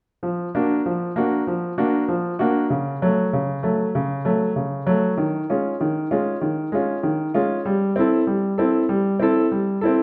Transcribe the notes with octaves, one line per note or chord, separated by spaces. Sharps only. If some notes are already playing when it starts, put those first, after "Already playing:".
F3
A#3 D4 F#4
F3
A#3 D4 F#4
F3
A#3 D4 F#4
F3
A#3 D4 F#4
C#3
F#3 A3
C#3
F#3 A3
C#3
F#3 A3
C#3
F#3 A3
D#3
G#3 C#4 F4
D#3
G#3 C#4 F4
D#3
G#3 C#4 F4
D#3
G#3 C#4 F4
G3
C4 E4 A4
G3
C4 E4 A4
G3
C4 E4 A4
G3
C4 E4 A4